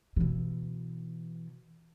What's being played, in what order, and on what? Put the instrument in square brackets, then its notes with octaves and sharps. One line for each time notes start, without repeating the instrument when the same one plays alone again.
[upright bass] B2 E3